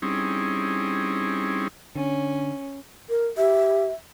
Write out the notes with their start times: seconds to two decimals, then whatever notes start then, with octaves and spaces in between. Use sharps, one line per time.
0.02 G3 C4 C#4 D#4 E4 G#4
1.95 D3 C#4
3.10 A#4
3.37 G4 E5